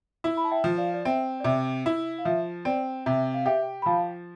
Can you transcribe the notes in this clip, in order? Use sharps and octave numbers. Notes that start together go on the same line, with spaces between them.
E4
B5
A5
E5 G5
F3
D5 F5
D5
C4 E5
D5
C3 E5
E4 E5
F5
F3 E5
C4 D5
C3 E5
F5
G4 E5 G5
B5
F3 F5 A5